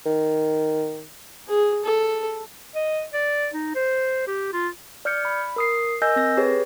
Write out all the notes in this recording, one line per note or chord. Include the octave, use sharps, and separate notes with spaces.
D#3
G#4
A4
D#5
D5
D#4
C5
G4
F4
D5 F6 G6 C#7
B5
A#4 D#6 C7
A#4 D#5 G#5 E6 G6 A#6
C4 A#6
G4 G#4 B4 C#5